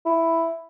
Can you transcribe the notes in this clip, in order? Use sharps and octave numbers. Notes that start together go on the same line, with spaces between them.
E4